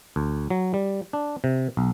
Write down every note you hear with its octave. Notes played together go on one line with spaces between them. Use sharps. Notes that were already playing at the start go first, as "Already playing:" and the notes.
D2
F#3
G3
D4
C3
B1